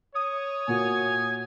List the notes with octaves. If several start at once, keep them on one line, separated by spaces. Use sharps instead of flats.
C#5 D#6
A#2 F#4 G#5